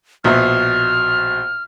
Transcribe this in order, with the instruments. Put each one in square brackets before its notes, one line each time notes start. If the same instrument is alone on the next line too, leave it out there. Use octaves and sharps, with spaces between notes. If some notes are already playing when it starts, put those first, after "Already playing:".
[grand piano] A#1 B2 E5 [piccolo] F6